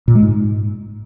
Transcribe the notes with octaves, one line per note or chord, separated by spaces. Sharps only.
A#2
G#3
G#2